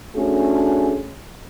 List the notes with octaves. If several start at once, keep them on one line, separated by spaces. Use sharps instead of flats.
A3 C#4 D4 F#4 G#4